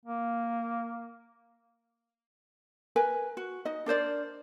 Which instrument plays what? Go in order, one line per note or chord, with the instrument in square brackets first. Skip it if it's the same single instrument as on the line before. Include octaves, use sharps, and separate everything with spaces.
[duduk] A#3
[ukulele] A#4 B4 G#5
F#4
D#4 D#5
D4 A#4 C5 D5